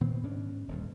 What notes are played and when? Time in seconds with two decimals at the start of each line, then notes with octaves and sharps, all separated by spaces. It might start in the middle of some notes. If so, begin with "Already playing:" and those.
0.01 A#2 D#3 B3 C4
0.23 G#2 C#4 D4
0.68 D#1 D2 G2